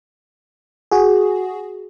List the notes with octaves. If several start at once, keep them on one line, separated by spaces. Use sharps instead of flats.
F#4 G#4